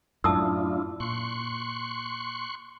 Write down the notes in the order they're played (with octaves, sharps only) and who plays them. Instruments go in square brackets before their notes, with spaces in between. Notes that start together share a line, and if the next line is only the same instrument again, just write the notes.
[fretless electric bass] F#2 A2 [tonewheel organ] D4 E4 F4 [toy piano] A5 D#6 E6
[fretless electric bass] A#2 [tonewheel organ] C6 C#6 F#6